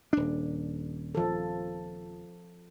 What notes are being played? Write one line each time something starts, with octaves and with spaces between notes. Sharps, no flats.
D#1 D4
F3 A4